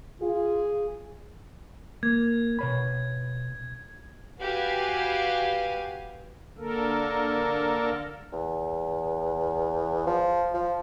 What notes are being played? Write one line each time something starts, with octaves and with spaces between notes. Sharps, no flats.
F4 G#4
A#3 G#6
B2 C#5 B5
F#4 G4 B4 F5 G#5
D3 A#3 A4 A#4
E2
F3
F3